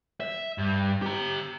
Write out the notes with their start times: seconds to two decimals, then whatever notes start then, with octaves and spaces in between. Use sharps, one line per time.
0.20 E5
0.58 G2
1.02 G4 A#5